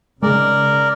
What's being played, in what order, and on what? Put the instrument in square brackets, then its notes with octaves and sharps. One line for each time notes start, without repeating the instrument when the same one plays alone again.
[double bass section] C#3 [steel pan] G#3 [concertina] A#4 D5